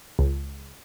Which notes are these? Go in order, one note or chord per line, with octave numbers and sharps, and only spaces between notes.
C#2